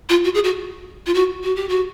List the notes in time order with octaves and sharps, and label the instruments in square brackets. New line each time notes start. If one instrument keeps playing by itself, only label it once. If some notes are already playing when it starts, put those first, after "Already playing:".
[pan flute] F4
F#4
G#4
F#4
F4
F#4
F#4
G4
F#4